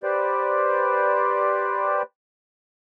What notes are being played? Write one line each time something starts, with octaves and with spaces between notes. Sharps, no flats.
G4 B4 C5 D5